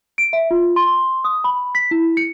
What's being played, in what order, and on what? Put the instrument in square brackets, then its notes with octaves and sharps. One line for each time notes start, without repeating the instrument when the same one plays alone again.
[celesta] D7
E5
F4
C6
D#6
B5
B6
E4
C#7